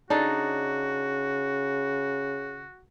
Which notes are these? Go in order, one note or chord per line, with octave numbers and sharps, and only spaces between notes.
C#3 D4 D#4 F#4 A4